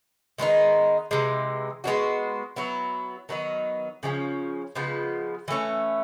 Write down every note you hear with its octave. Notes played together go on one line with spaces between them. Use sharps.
D#3 G#3 B3 D#4
C3 E3 G#3
G#3 B3 D4 F#4
F#3 B3 E4
D#3 F#3 B3 D#4
C#3 F3 A3 C#4
C#3 F3 G#3 B3
E3 A3 C#4